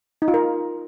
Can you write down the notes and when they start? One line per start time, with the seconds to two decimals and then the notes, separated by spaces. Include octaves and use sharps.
0.22 D#4
0.28 F4
0.34 A#4